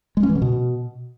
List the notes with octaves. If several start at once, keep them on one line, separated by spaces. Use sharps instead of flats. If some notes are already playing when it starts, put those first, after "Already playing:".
G#3
C#4
E3
D3
B2